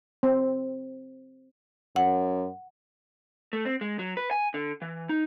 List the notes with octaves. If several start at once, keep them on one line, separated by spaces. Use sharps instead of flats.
C4
F#2 F#5
A3
C4
G#3
F#3
B4
G#5
D3
E3
D#4